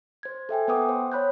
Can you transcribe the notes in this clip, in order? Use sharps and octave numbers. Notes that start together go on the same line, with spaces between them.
C5 G#6
A4 E5 G5 G#5
B3 B4 F#5 G5 D6 D#6
C5
C#5 B5 F#6 G6